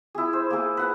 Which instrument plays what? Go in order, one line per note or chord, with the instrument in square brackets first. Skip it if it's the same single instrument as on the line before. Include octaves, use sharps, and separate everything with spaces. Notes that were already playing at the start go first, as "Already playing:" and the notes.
[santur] E4 G#4
C5
A#3 G#4
B4 F#5